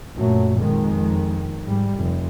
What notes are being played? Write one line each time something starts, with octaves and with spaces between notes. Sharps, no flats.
F#2 A#2 F#3 A3
F2 D#3 G#3
G#2 G3
F1